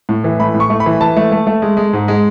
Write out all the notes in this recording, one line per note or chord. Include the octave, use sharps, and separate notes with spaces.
A2
E3
A3 B5
A2
C#6
A3
B5
E3
E3 A5
A3
A3
A3
G#3
G#3
G#2
G#3